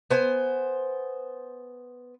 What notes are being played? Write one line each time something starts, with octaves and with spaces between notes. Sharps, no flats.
B3 C5 G#5